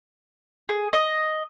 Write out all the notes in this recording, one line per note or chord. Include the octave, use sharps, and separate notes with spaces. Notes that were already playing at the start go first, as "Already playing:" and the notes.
G#4
D#5